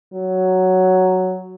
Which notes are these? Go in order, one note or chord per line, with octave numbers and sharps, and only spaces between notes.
F#3